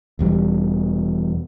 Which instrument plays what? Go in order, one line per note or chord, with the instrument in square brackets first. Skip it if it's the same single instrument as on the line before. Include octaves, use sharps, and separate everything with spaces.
[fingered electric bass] E1 E2 G3